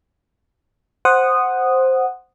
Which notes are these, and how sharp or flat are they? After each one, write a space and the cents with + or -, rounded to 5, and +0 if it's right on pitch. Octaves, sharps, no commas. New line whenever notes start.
C5 +0 F#5 +0 D#6 -10